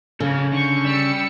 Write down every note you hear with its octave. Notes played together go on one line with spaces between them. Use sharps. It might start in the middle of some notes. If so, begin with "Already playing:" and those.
C#3 A4 F5
D3 C#6 G6
G3 E6 C#7